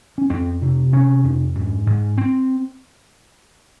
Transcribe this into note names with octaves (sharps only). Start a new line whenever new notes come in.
C#4
F2 C4
C3
C3 C#4
F2
G#2
G#2
C4